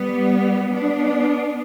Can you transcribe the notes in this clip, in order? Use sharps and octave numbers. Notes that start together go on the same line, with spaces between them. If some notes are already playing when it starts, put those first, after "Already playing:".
Already playing: G3 B3
B3 D4